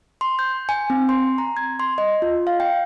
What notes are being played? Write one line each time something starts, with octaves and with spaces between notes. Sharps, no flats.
C6
G6
G#5
C4
C6
A#5
G#6
C6
D#5
F4
F5
G5